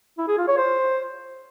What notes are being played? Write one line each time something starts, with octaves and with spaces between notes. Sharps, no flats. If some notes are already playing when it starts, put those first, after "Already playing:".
E4
G#4
F4
C#5
C5